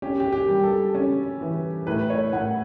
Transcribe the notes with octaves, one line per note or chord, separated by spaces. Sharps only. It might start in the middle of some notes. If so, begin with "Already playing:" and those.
C#4 G4
G4
G4
G3
A4
C#4
E3
A2 B4
C#5
A2 F#5